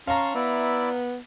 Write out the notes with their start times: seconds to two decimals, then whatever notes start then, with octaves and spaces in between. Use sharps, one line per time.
0.07 C#4 F5 A5 A#5 C6 C#6
0.35 B3 E4 D5 E5